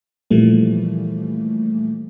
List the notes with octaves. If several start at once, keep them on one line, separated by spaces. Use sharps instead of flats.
A#2 E3 F3 G3 A3 A#3